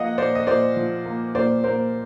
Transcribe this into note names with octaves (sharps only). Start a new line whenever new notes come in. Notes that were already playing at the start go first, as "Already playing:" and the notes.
Already playing: F3 A#3 D#5 F5 F#5
A#2 C5 D5
D#5
A#2 C5 D5
F3
A#3
A#2 C5 D5
A#2 A#4 C5